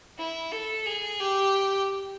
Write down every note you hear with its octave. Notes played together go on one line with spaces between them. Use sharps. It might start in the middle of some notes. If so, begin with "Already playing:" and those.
E4
A4
G#4
G4